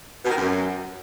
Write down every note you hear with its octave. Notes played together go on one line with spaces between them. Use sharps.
B2
D#3
F#2